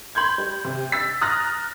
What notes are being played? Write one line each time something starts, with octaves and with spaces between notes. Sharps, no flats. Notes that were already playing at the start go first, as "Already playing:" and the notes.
B5 C6 G6 G#6
G3
C3
E6 A6 B6
A#5 D#6 F6 F#6 A6 A#6